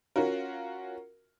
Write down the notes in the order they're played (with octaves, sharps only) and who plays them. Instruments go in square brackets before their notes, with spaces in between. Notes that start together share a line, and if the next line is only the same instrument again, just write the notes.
[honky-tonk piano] C#4 F4 F#4 A#4